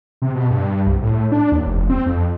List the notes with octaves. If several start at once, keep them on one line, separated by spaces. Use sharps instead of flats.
C3
B2
G2
C2
A2
D4
D#2
F1
C4
F2